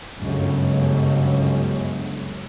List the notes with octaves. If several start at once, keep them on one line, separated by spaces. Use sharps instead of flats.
G1 C#2 F#2